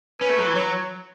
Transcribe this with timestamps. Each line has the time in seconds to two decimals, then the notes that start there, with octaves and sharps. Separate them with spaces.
0.21 C#4 B4
0.29 A3
0.39 F#3
0.47 E3
0.55 F#3 C#5